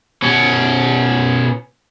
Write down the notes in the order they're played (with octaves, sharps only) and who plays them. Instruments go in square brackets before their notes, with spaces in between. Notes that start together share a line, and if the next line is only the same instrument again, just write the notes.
[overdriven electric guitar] B2 C#4